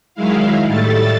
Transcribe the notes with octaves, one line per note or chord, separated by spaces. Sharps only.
D#3 F#3 G#3 E4 F5
A2 G3 A3 A4 A5 A6